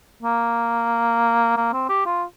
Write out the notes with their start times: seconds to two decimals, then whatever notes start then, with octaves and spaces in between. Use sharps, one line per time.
0.23 A#3
1.57 A#3
1.73 C4
1.89 G4
2.06 F4